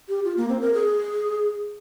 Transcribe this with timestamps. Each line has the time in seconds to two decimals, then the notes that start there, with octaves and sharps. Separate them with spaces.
0.08 G4
0.25 F4
0.37 A#3
0.49 C4
0.61 A#4
0.74 G#4